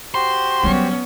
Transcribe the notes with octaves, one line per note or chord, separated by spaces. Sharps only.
F#4 G4 C5 C6
F#3 G3 B3 C#4